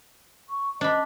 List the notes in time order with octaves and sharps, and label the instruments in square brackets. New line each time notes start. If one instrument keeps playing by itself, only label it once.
[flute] C#6
[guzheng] D4 B5 [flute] D#5